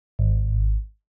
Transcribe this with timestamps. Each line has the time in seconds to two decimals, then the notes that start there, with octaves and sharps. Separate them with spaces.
0.19 G#1